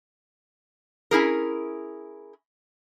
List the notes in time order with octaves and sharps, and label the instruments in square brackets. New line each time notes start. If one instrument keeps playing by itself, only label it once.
[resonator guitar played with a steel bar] C#4 E4 G#4 A#4